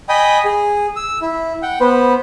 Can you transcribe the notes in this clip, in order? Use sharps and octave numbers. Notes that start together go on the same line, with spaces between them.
D#5 G5 G#5 B5 D#6
G#4
E6
E4
F#5 G5
B3 B4 C5